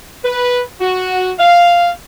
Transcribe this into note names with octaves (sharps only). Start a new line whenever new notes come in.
B4
F#4
F5